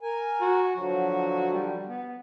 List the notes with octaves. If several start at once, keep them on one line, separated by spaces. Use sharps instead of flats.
A#4 G#5
F#4
D3 F3 F#3 F#4
G3
B3